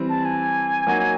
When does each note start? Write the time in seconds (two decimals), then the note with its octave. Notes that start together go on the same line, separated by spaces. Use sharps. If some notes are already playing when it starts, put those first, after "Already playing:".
Already playing: E3 G3 C4
0.09 A5
0.25 G#5
0.87 F#3 A#3 D#4 F#4